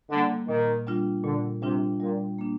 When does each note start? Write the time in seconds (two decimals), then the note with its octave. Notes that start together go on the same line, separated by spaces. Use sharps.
0.10 D3 G3 A#3
0.48 A#2 D#3
0.87 G3 D4 F4
1.24 A#2 D3
1.62 C3 G3 D4 F4
1.99 A#2 G3
2.38 A#3 D4